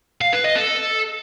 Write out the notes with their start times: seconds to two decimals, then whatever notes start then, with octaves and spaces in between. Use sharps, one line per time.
0.21 F5
0.33 B4
0.44 D#5
0.56 A4